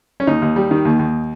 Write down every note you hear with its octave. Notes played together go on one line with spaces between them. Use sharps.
C#4
D#2 D#4
D#2
G3
D#3
D#2
D#2